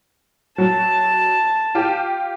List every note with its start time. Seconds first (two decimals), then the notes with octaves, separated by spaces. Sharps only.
0.58 F#3 A5
1.75 F4 G4